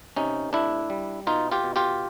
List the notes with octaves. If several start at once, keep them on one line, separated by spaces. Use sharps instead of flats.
C3 C#4 D#4
A2 D4 E4
G3
B2 D#4 F4
F4 G4
B2
F4 G4